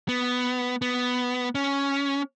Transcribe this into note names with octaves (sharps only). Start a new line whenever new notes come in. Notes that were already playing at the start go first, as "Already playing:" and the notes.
B3
B3
C#4